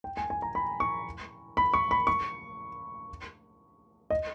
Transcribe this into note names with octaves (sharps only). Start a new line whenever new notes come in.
G5
G#5
G#5
A#5
B5
C#6
B5
C#6
B5
C#6
D#5